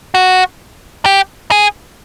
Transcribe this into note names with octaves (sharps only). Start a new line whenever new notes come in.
F#4
G4
G#4